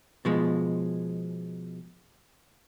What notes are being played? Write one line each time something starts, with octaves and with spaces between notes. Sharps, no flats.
B2 F3 G#3